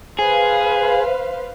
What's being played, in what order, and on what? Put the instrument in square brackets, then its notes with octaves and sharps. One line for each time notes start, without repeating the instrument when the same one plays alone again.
[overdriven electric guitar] G#4 [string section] B4 C5 F5